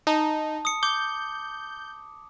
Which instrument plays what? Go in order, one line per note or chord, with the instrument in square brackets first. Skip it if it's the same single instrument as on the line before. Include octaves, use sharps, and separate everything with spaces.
[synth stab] D#4 [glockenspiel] A5
[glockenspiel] D#6 C#7
[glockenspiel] D6 [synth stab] G6